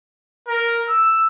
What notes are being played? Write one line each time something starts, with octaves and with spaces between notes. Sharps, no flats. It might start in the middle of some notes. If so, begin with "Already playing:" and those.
A#4
E6